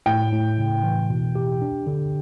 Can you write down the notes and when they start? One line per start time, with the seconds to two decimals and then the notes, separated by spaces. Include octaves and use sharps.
0.06 A2 G5
0.32 A2
0.58 C#3
0.83 E3
1.10 B2
1.35 G4
1.62 D4
1.87 D3